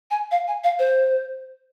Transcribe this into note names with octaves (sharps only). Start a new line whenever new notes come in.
G#5
F5
G#5
F5
C5